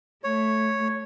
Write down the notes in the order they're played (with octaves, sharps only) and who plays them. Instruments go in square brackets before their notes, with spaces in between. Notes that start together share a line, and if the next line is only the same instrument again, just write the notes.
[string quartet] A3 [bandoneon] C#5